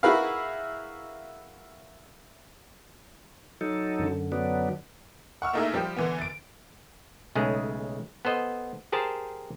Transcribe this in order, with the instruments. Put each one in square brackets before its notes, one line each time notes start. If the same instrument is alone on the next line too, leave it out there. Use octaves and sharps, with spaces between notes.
[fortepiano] E4 F#4 G#4 A#4 B4 F5
[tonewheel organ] F#3 D#4 A4
[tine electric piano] F#2 D3
[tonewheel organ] F#3 B3 D4
[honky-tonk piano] F#5 C#6 E6 F6
A3 A#3 D#4 E4 G#4 E5
F3 G3 G4 C5
D3 E3 B3
A6 D7
[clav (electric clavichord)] B1 C#3 G#3 A3 G#4
B3 A4 C5 D#5
G4 G#4 A#4 C5 A5